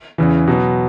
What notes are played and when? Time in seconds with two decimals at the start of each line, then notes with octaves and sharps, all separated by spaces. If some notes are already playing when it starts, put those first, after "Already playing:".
0.18 E2 C#3 E3
0.48 B2 F#3 B3